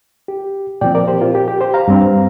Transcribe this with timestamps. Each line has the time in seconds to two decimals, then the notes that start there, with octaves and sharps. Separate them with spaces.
0.28 G4
0.81 A#2 F3 C4 D5 G5
0.95 A#4 D5
1.08 G4 C5
1.21 F4 A#4
1.35 G4
1.48 G4
1.61 G4 C5
1.74 F5 A#5
1.88 G2 G3 C4